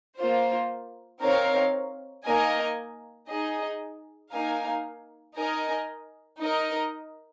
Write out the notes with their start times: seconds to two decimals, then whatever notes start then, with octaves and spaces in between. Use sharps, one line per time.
0.18 A#3 F4 C5
1.21 C4 D#4 A#4 C#5 F5
2.25 A#3 D#4 A#4 D#5 G#5
3.29 D#4 G#4 D#5
4.32 A#3 D#4 A#4 F5 G#5
5.36 D#4 A#4 D#5 G#5
6.39 D#4 A#4 D#5